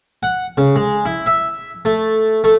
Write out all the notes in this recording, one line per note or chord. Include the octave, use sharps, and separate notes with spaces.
F#5
C#3
G#3
E4
E5
A3
A3